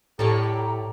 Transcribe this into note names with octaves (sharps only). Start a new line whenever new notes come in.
A2 G4 A4 C#5 D5 A#5